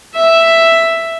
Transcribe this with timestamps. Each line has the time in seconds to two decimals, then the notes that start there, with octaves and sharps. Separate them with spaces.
0.15 E5